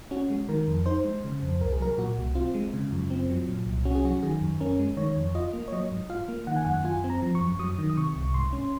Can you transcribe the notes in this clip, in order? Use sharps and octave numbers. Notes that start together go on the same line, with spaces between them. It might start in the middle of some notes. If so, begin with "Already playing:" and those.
C#4 F#4
G#3
D#3 A#4
F2
D#4 C5
G#3
C#3
F2
C2 A#4
G#4
F#3 A#4
A#2 F#4
C2
C4 F4
G#3
C#3
F#2
C4
F#3
A#2
C2
C#4 F#4
G#4
F#3 F#4
D#3 G#4
F#2
C#4 A#4
G#3
D#3 C#5
F2
F4 D#5
A#3
C#5
F#3 D#5
G#2
F4 F5
A#3
D#3 F#5
G#5
F#2 F#5
F4 G#5
C4
A#5
F3
C#6
F#2
F#3 D#6
D#3
D#6
C3 C#6
C2
G#2 C6
C#4